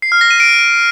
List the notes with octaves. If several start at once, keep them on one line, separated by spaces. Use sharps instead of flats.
C7
F6
A#6
D#7
D7